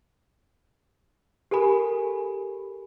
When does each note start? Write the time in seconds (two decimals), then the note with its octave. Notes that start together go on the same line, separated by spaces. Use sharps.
1.51 G4 A4 A#4 G#5 B5